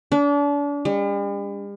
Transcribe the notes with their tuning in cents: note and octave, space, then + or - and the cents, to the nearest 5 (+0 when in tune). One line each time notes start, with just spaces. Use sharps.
D4 -35
G3 +45